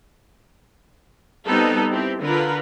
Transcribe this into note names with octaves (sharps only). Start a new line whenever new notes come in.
G3 B3 C4 D#4 A4
C4 E4 G4
D3 F4 A#4 B4